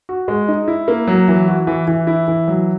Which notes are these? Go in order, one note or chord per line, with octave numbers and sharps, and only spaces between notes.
F#4
G#3
D#4
E4
A#3
F#3
E3
F#4
E3
E3
E4
E3
F#3